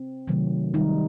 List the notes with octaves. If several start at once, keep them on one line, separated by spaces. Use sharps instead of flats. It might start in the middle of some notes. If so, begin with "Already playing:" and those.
Already playing: C4
C3 D#3 F#3 A3
D#3 G3 D#4